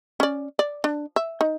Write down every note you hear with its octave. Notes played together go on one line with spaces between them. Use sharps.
C#4 D5
D5
D4
E5
D#4